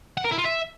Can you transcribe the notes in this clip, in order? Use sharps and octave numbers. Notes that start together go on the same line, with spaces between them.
F#5
A#4
E4
F4
E5